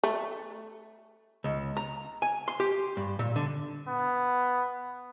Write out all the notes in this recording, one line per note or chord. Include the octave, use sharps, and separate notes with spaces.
A3
C#2
A#5
G#5
C6
G4
G2
A#2
D3
B3